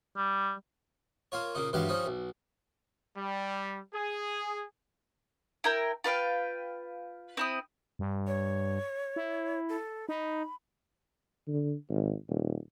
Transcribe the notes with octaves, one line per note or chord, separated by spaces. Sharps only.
G3
A#3 F4 C#5
A#2 C#3 D#4
G2 E3 F#3 G#3 G4 F5
F3 G3 C#4 D#4
B1
G3
G#4
E4 A#4 G5
F4 B4 F5 G5
C4 E4 D#6
G2
C#5
E4
A4
D#4 B5
D3
G#1
D#1